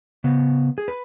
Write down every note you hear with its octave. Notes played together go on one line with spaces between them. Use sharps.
C#3 B3
G#4
B4